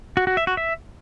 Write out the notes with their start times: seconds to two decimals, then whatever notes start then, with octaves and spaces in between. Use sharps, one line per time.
0.17 F#4
0.27 F#4
0.37 E5
0.47 F#4
0.57 E5